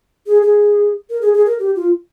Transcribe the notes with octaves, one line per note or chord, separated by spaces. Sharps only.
G#4
G#4
A#4
G#4
G#4
A#4
G4
F4